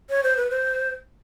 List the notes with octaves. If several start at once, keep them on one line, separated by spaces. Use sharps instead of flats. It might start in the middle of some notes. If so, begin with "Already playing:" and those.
C#5
C5
B4
C5